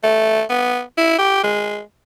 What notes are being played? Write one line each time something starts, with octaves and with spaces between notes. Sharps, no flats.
A3
B3
E4
G4
G#3